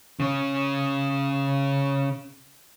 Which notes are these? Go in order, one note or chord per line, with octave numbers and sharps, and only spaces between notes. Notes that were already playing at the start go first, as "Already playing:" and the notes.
C#3 C#4